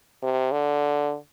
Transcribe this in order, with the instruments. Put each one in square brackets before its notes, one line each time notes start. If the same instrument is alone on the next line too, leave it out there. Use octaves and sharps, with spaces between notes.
[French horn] C3
D3